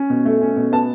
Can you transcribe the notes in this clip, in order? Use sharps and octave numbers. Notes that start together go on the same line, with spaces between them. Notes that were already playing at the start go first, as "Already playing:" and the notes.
Already playing: C#4
B2
A3
C#4
B2
B3 A5